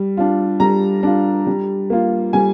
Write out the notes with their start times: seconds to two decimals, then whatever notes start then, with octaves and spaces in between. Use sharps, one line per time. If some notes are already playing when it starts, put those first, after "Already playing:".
Already playing: G3
0.17 D4 F4
0.60 G3 A#5
1.03 D4 F4
1.47 G3
1.90 A#3 F4
2.33 G3 G#5